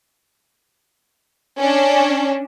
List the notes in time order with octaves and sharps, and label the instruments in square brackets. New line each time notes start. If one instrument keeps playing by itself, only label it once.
[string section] C#4 D4